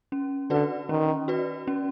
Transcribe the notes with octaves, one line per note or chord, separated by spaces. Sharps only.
C#4
D3 F#4 B4 D5
D#3 C#4
F#4 B4 D5
C#4